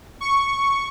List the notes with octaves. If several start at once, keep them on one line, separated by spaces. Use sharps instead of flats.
C#6